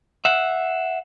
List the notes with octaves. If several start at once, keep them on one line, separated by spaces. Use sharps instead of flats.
E5 F#5